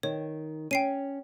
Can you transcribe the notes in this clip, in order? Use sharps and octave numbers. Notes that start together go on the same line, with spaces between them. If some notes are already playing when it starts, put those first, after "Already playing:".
D#3 C#5
C#4 G5 C7 D#7